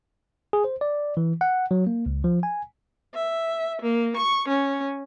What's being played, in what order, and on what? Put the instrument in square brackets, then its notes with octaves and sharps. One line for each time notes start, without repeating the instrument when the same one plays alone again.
[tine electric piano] G#4
C5
D5
E3
F#5
F#3
A#3
C#2
F3
G#5
[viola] E5
A#3
C#6
C#4